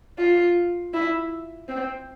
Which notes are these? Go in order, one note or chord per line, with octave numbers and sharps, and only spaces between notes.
F4
E4
C4